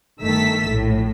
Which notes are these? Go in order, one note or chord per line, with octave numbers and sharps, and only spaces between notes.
G1 D#3 A3 A4 E6 B6
A#1 A2